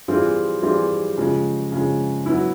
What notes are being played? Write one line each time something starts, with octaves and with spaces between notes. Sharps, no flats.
E3 G3 C4 F4 G#4
E3 G3 C4 F4 G#4
C#3 F3 G#3
C#3 F3 G#3
F#3 B3 E4